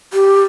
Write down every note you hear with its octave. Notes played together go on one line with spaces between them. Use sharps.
G4